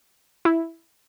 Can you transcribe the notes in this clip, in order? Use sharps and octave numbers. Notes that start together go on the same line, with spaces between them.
E4